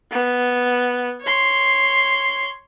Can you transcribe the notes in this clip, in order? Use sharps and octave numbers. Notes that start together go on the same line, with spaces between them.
B3
C#5 C6